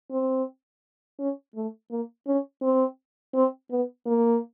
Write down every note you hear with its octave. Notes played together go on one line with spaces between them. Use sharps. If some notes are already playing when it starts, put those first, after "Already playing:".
C4
C#4
A3
A#3
C#4
C4
C4
B3
A#3